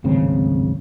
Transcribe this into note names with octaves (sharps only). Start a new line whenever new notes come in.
D1 G#1 C#3 C4